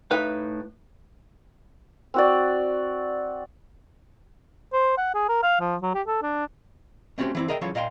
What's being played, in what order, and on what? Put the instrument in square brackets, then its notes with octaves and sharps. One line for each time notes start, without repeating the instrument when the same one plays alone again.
[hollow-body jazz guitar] A2 D#4 B4 E5 F5
[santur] C4 F#4 D5
[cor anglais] C5
F#5
G#4
A#4
F5
F3
F#3
G4
A4
D4
[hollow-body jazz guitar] A3 C4 C#4 F#4 G4 C5
E3 C4 E4
G#4 A#4 D#5 E5 G5
C#3 E3 F#3 F4 A4 C#5
A#2 D#5 F5 G5 C6